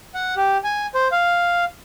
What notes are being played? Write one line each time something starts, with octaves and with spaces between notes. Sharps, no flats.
F#5
G4
G#5
C5
F5